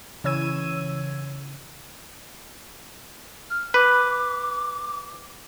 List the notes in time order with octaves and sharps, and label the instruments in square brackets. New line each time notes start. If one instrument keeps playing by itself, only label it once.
[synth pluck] C#3 E3 C#5 E6 G#6 D#7
[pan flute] F6
[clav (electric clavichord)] B4 [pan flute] D6